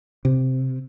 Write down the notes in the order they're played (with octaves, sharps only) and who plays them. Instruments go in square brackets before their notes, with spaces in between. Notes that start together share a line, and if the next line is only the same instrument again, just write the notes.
[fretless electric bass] C3